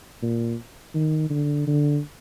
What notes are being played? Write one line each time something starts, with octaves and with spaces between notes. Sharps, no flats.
A#2
D#3
D3
D3